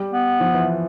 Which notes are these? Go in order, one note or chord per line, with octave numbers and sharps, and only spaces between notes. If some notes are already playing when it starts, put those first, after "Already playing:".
Already playing: G3
B3
F3
E3